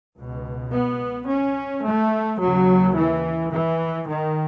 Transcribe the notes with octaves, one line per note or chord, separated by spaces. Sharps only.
C#2 B2
B3
C#4
A3
D#2 C#3 F#3
E3
E3
D#3